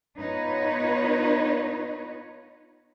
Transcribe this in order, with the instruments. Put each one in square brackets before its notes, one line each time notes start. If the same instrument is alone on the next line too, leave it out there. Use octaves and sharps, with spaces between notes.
[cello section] B3 D#4 F4 B4 C#5